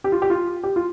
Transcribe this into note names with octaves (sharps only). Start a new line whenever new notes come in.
G4
F4
G4
F4
G4
F4